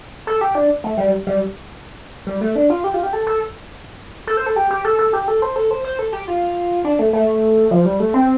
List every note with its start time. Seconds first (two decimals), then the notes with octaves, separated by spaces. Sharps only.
0.27 A4
0.41 G4
0.55 D4
0.84 A3
0.98 G3
1.27 G3
2.27 G3
2.41 A3
2.56 D4
2.70 F4
2.84 G4
2.94 F4
3.03 G4
3.13 A4
3.27 A4
4.27 A4
4.37 C5
4.46 A4
4.56 G4
4.71 G4
4.85 A4
4.99 A4
5.13 G4
5.28 A4
5.42 C5
5.56 A4
5.71 C5
5.85 C5
5.99 A4
6.13 G4
6.28 F4
6.85 D4
6.99 A3
7.13 A3
7.71 F3
7.85 G3
8.00 A3
8.14 C4